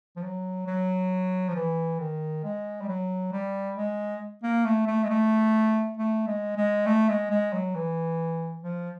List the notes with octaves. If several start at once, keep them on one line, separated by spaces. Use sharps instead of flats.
F3
F#3
F#3
F3
E3
D#3
G#3
G3
F#3
G3
G#3
A#3
A3
A3
G#3
A3
A3
G#3
G#3
A3
G#3
G#3
F#3
E3
F3